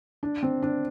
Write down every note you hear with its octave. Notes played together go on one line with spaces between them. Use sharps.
D4
C4
D4